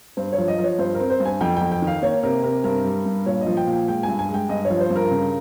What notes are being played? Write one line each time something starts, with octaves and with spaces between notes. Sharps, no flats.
G2 C5
C#5
F3
D#5
F3
C#5
G2 C5
A#4
C4
C5
G2
G#5
F2 G5
F2 G5
G5
D#3
F5
A#3 C#5
C3 A#4
C3 A#4
G2 A#4
G3
G2
A#2 C#5
D#5
F3
G5
A#2
G5
G#3 G5
G#5
G2
G#5
G#3
G5
G2 D#5
C#5
F3
C5
G2
A#4
C#3